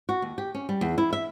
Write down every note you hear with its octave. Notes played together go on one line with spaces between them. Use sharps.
F#4
D#2
G4
C#4
G3
E2
E4
E5